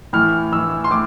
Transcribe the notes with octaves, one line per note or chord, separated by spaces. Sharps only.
A2 E3 F6
A2 E3 E6
C6
A2 D6